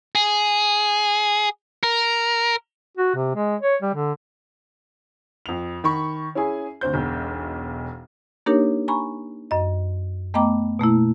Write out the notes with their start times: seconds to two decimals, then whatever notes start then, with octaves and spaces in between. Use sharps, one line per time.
0.15 G#4
1.83 A#4
2.97 F#4
3.15 C3
3.35 G#3
3.61 C#5
3.82 G3
3.94 D3
5.46 F2 F7
5.84 D#3 B5 C#6
6.35 C#4 E4 G#4 G#5
6.81 D2 C4 C5 G6
6.93 E1 B1
8.46 A#3 D4 D#4 G4 A#4 C#5
8.88 G#5 A#5 B5 C#6
9.51 F#2 D#5
10.34 A3 B3 D#5 G5 A#5 D6
10.79 B2 A3 A#3 E4